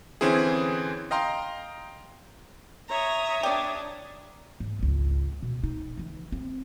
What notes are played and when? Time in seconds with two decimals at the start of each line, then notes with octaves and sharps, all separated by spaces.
0.21 D3 E3 C4 C#4 E4 G#4
1.11 D#5 F5 G5 A#5 C6
2.89 C#5 E5 A#5 D#6
3.43 D4 G4 D5
4.60 G#2
4.79 G#1 C#2
5.42 B2
5.64 D#4
5.98 C#3 E3
6.32 C4